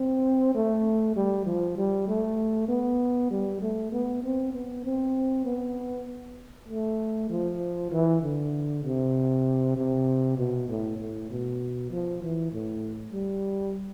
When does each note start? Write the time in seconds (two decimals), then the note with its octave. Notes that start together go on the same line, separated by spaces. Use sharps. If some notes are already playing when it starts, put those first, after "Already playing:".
Already playing: C4
0.55 A3
1.16 G3
1.46 F3
1.77 G3
2.08 A3
2.69 B3
3.31 G3
3.62 A3
3.92 B3
4.23 C4
4.53 B3
4.84 C4
5.45 B3
6.69 A3
7.30 F3
7.91 E3
8.22 D3
8.84 C3
9.77 C3
10.38 B2
10.69 A2
10.98 A2
11.30 B2
11.91 F3
12.23 E3
12.52 A2
13.14 G3